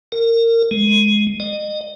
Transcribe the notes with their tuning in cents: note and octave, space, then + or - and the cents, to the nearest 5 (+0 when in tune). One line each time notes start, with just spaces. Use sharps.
A#4 -25
G#3 +10
D#5 -30